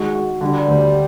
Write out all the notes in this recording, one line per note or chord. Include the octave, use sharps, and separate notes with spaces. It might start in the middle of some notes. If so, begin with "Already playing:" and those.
Already playing: D#3 G#3 F#4
F#4
D3 G3
D2